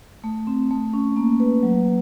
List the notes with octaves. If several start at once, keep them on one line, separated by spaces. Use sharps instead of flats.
A3
C4
A3
C#4
A#3
B4
F#3